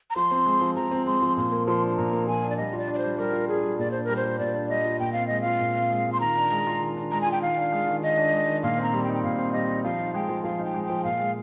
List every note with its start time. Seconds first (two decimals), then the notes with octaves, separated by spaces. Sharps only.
0.10 A#5
0.16 F3 C6
0.31 C4
0.46 G#3
0.61 F3
0.76 F3 A#5
0.91 C4
1.06 G#3 C6
1.21 F3
1.37 A#2 C6
1.52 A#3
1.67 F3 C6
1.82 D4
1.87 C6
1.97 A#2 A#5
2.12 A#3
2.27 F3 G#5
2.42 D4
2.50 D5
2.57 G3 D#5
2.73 F4
2.78 D5
2.88 D4
2.94 D5
2.98 C5
3.03 G3
3.18 G3 A#4
3.33 F4
3.48 D4 G#4
3.63 G3
3.78 A#2 D5
3.91 D4 C5
4.04 G3 A#4
4.16 C5
4.24 F4
4.39 A#2 D5
4.54 D4
4.69 G3 D#5
4.85 F4
4.99 A#2 G5
5.13 C4 F5
5.28 G#3 D#5
5.41 F4 F5
5.60 A#2
5.75 C4
5.90 G#3
6.06 F4
6.13 C6
6.20 D#3 A#5
6.36 D4
6.51 G#3
6.67 F4
6.81 D#3
6.97 D4
7.11 G#3 A#5
7.21 F4 G#5
7.32 G5
7.42 D#3 F5
7.57 D4
7.72 G#3
7.87 D#3
8.02 D#3 D#5
8.17 D4
8.32 G#3
8.47 D#3
8.63 A#2 F5
8.78 C4 A#5
8.93 G3
9.04 G5
9.09 D#4
9.14 G5
9.23 A#2 F5
9.38 C4
9.53 G3 D#5
9.69 D#4
9.84 F3 F5
9.99 D#4
10.14 G#3 G5
10.29 F3
10.44 F3 F5
10.59 D#4
10.64 G5
10.74 G#3
10.84 G5
10.90 F3
11.04 A#2 F5
11.20 G#3